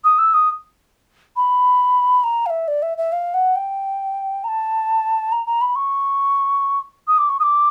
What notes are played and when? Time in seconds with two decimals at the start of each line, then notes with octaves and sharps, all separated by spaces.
0.04 D#6
0.18 E6
0.34 D#6
1.36 B5
2.24 A#5
2.46 F5
2.50 E5
2.68 D5
2.82 E5
2.98 E5
3.12 F5
3.34 F#5
3.56 G5
4.44 A#5
4.48 A5
5.32 A#5
5.46 A#5
5.61 B5
5.75 C#6
7.07 D#6
7.18 D6
7.29 C#6
7.40 D#6
7.43 D6